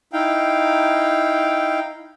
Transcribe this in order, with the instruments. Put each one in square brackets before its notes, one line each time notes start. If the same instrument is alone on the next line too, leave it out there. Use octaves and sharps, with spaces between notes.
[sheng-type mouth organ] D#4 E4 F5 G5